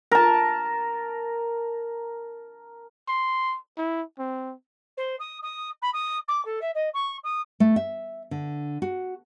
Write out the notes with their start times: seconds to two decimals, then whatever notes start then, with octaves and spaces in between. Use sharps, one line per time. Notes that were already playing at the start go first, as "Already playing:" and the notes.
0.12 A#4 A5
3.08 C6
3.77 E4
4.19 C4
4.97 C5
5.19 D#6
5.42 D#6
5.81 B5
5.93 D#6
6.28 D6
6.45 A4
6.61 E5
6.74 D#5
6.93 C#6
7.23 D#6
7.60 A3
7.76 E5
8.31 D3
8.82 F#4